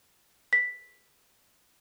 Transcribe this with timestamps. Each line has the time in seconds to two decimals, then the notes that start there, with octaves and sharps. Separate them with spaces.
0.53 B6